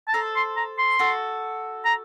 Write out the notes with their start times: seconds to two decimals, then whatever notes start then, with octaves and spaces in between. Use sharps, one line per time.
0.08 A5
0.14 A4 C5 A#5
0.36 C6
0.57 A#5
0.79 C6
0.99 F#4 A4
1.85 A#5